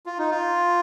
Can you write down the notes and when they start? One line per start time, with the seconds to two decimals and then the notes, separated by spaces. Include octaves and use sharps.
0.06 F4
0.18 D#4
0.30 F4